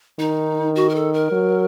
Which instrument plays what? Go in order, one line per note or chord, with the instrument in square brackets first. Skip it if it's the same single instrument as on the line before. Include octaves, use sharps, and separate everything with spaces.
[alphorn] D#3 [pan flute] D#4
[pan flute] F#4
A#4
A4
A#4
[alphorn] F#3